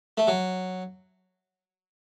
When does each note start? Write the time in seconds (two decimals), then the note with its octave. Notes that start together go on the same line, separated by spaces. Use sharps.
0.17 A3
0.27 F#3